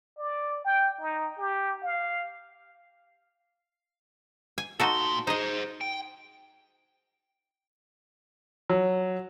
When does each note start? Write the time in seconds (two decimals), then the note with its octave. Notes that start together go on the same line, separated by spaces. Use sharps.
0.18 D5
0.65 G5
1.01 D#4
1.38 G4
1.83 F5
4.58 G#5
4.80 A#2 D#4 F#4 A4 C6
5.27 D#4 G#4 C5 D#5
5.81 G5
8.70 F#3